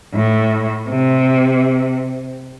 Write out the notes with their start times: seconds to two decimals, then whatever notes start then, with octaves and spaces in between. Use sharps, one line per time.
0.14 A2
0.89 C3